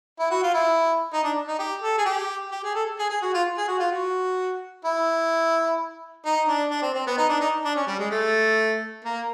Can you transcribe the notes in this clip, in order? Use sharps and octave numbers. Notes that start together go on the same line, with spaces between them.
E4
F#4
F4
E4
D#4
D4
D#4
G4
A4
G#4
G4
G4
G#4
A4
G#4
G#4
F#4
F4
G#4
F#4
F4
F#4
E4
D#4
D4
D4
C4
C4
B3
D#4
D4
D#4
D4
C#4
G3
G#3
A3
A#3